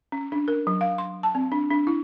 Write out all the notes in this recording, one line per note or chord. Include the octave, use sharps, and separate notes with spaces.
C#4
D4
A#4
F#3
F5
C6
A5
C4
D4
D4
E4